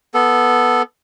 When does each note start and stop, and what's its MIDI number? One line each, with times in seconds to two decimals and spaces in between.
0.14 0.82 59
0.14 0.82 69